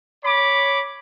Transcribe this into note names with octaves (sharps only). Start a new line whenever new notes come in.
C#5 B5 D6